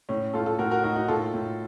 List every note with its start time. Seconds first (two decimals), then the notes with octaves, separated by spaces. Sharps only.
0.09 A2 C#4
0.34 A2 F4 A4
0.46 F4 A4
0.59 A2 F#4 A#4
0.71 F#4 A#4
0.83 A2 D#4 F#4
0.96 D#4 F#4
1.08 A2 F4 A4
1.34 A2